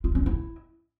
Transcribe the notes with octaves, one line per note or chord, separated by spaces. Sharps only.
F4
C#4
E4